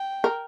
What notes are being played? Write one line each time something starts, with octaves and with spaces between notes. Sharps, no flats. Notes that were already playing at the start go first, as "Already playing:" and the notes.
Already playing: G5
A#4